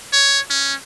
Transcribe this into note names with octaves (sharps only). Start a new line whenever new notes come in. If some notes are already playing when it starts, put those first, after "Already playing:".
C#5
C#4